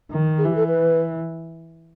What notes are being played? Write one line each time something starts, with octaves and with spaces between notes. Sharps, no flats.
D#3
G#4
E3 G4
A4
B4